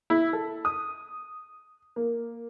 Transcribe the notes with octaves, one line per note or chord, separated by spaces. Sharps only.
E4
A4
D#6
A#3